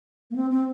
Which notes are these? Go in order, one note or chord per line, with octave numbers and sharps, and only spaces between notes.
A#3
C4
C4